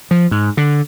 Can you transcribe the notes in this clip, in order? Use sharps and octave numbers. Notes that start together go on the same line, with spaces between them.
F3
G#2
D3